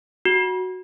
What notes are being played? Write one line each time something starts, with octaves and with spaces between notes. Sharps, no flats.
F#4